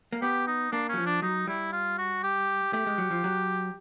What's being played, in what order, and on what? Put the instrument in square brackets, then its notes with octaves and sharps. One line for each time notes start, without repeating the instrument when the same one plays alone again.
[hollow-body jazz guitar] A#3
[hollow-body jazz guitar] B3 [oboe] G4
[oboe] D#4
[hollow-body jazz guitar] A#3 [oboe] D4
[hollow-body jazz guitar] F#3 [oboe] C#4
[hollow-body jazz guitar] F3
[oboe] D4
[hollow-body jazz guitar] F#3 [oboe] D#4
[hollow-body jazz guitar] G3 [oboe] E4
[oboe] F4
F#4
G4
[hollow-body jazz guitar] A3 [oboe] G4
[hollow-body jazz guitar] G#3
F#3
F3
F#3